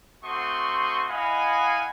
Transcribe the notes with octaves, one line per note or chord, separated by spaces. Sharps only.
A3 C4 F#4 C6 C#6 D#6
E4 D#5 F5 F#5 G#5 B5